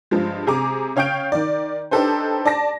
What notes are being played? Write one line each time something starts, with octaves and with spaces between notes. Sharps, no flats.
G2 F3 G#3
C3 G#4 A#5 D6
C#3 C#5 F5 G5 G6 D7
D#3 D5
D4 D#4 G4 A4 B4 C5
D5 A5 A#6